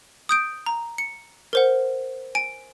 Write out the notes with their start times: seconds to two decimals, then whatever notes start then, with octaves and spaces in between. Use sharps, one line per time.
0.29 D#6 G6 D7
0.66 A#5
0.98 C#7
1.53 A#4 C5 F#5
2.35 G#5 D7